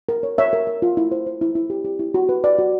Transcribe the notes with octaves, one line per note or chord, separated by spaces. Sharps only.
A#4
C#5
C#5 E5
A#4
A#4
F4
E4
C5
C5
E4
E4
G4
G4
E4
F#4
B4
B4 D5
F#4